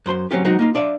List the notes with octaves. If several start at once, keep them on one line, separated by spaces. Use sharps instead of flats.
F#2 C5 B5 C6
F#3 G3 C4 C#4 F4 G4
F#3 G#3 C4 D#4 F#4
A#3 D#4 F4
D4 D5 E5 F5